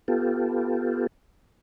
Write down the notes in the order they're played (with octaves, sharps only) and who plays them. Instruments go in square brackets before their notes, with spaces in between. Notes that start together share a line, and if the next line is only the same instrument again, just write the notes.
[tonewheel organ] B3 F4 G4 A4